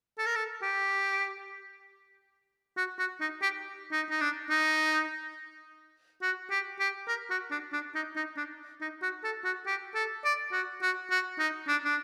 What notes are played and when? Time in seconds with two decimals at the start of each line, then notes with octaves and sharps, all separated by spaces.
0.18 A4
0.27 A#4
0.36 A4
0.62 G4
2.77 F#4
2.99 F#4
3.21 D#4
3.42 G4
3.92 D#4
4.10 D#4
4.21 D4
4.50 D#4
6.22 F#4
6.51 G4
6.80 G4
7.08 A#4
7.30 F#4
7.51 D4
7.73 D4
7.95 D#4
8.16 D#4
8.37 D4
8.81 D#4
9.02 F#4
9.24 A4
9.45 F#4
9.67 G4
9.95 A4
10.25 D5
10.52 F#4
10.82 F#4
11.11 F#4
11.39 D#4
11.68 D4
11.85 D4